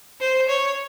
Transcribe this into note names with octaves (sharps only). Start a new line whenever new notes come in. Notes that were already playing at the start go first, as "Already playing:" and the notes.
C5
C#5